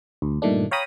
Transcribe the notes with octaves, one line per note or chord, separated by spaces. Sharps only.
D2
G2 A#2 D#3 A3 D4
C#5 F5 G5 A#5 B5 D#6